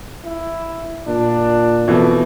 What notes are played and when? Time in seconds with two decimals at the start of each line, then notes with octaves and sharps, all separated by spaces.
0.24 E4
1.07 A#2 D4
1.88 F2 B2 E3 A3